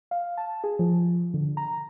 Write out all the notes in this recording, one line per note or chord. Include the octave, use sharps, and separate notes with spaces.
F5
A5
G#4
F3
D3
A#5